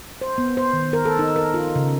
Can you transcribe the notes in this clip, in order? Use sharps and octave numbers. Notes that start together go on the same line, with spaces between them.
C5
B3
C5
D#3
A#4
A4
D#4
A#4
F4
C#3